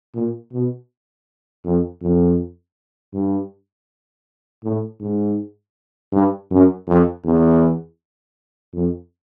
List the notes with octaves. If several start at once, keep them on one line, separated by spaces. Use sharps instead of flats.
A#2
B2
F2
F2
G2
A2
G#2
G2
F#2
F2
E2
F2